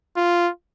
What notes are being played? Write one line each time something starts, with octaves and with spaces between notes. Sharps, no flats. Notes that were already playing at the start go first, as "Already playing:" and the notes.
F4